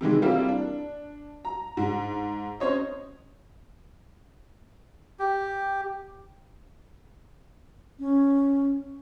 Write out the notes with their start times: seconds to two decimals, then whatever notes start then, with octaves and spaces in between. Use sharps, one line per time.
0.01 C3 D#3 E3 G#3
0.22 G3 A#3 C4 E4 F4
0.48 D4
1.45 A#5
1.77 G#2
2.60 C#4 C5 C#5 D#5
5.19 G4
7.99 C#4